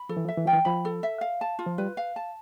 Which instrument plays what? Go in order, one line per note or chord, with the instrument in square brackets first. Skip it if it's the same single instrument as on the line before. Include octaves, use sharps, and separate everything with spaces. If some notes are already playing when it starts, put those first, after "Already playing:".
Already playing: [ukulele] B5
[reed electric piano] F3 [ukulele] A4
[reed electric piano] E3
F3
[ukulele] E5
[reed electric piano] E3
[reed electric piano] F3 [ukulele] G5
[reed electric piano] E3
[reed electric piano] F3 [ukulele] B5
[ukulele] A4
E5
F5
A5
F4
[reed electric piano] F3
[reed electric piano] G3 [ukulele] B4
[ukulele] F5
A5